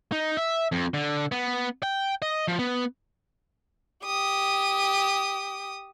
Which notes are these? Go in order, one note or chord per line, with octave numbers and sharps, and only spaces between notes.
D#4
E5
F2
D3
B3
G5
D#5
F3
B3
G4 D#6